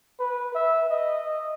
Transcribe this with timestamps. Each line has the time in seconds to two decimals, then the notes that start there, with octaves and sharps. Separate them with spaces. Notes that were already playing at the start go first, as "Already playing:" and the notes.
0.20 B4
0.55 E5
0.90 D#5